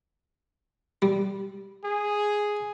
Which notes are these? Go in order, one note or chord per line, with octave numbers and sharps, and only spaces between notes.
G3
G#4